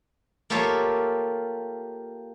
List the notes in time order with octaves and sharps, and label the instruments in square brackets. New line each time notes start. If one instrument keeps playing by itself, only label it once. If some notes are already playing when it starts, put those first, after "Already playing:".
[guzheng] A#3 F4 G4 A4 C#5 E5